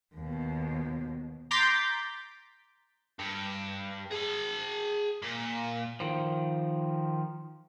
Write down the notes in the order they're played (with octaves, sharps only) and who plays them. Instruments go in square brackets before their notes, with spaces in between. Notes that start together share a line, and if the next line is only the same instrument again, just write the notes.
[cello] D#2 B2
[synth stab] A#5 C6 D6 G6 A6 B6
[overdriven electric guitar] G2
G#4 A5
A#2
[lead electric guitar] D#3 F3